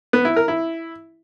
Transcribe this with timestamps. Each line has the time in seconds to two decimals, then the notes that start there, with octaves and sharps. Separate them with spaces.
0.13 B3
0.25 E4
0.36 A#4
0.48 E4